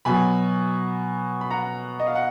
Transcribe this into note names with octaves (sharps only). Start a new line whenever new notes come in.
B2 F#3 G#5 B5
B5
F#5 A#5
D#5
F5
F#5